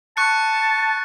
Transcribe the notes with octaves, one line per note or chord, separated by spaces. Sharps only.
A5 C#6 F#6 C#7